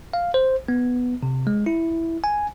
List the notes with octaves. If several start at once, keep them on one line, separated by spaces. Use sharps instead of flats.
F5
C5
B3
C3
G#3
E4
G#5